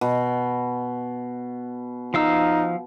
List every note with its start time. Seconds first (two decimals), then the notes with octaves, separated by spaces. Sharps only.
0.01 B2
2.14 F3 D#4 F5 E6